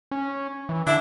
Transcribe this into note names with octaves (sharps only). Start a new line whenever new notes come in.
C#4
E3
D3 D4 E4